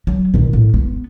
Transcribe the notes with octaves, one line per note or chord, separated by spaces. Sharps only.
F#3
B2 D#3
A2
B3